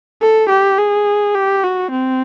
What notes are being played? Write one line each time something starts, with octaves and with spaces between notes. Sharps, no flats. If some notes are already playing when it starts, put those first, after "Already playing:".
A4
G4
G#4
G4
F#4
C4